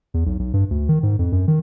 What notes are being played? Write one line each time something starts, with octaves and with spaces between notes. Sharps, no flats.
E2
B1
B1
G2
D2
D#3
G#2
F2
F#2
D#3